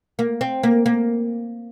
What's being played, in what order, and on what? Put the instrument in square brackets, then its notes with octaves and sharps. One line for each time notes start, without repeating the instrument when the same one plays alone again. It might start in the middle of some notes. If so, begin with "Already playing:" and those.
[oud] A#3
C4
A#3
A#3